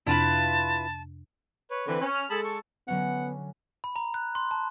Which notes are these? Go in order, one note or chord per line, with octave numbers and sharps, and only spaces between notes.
F2 C3 D4 E4 F4 B4 A5
B4 C#5
D3 E3 C4 B4
C#4
F6
G#3 G#4 A4 A5 B5
C#6
D3 F#3 B3 C#4 F#5
B5
A#5
F#6
C6
A5